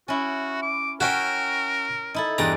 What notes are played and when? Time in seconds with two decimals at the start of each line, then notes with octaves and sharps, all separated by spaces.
0.08 C#4 E4 F#4
0.62 D6
1.01 C#4 F#4 A#4 C#5 E5 G5
2.14 D#4 E4 A4
2.38 E2 G2 D5 A#5